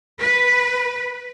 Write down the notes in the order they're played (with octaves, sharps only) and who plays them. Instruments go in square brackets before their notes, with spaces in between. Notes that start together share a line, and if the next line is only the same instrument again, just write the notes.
[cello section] B4